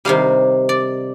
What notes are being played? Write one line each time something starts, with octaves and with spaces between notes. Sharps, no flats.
C3 D#3 G3 F5
D5